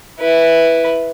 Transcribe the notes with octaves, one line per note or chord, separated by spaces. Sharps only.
E4 B4